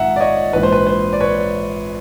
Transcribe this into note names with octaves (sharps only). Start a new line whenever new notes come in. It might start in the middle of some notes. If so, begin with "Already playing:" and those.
Already playing: A#1 G#2 D#3 E5 F#5 A#5
D5
C#5 D#5
A#1 G#2 E3 B4
C5
B4
C5
D5
B4 C#5